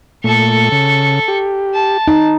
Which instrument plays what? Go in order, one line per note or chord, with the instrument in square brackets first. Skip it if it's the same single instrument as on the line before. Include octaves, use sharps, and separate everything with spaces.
[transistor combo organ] A#2 A3 [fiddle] A4 C#6
[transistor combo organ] C#3
G4
[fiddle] A5
[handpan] D#4